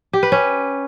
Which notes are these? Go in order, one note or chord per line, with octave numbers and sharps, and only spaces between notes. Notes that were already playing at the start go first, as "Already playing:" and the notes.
G4
B4
C#4